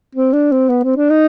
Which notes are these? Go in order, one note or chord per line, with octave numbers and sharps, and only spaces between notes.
C4
D4
C4
B3
C4
D4
D#4